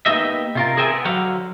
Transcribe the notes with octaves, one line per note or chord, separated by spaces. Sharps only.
A#3 B3 D#4 G4 D#5 E5
C3 F4 A#4
G#4 A#4 C5 E5 G5 G#5
B3
D3 F#3 C5 F5 F#5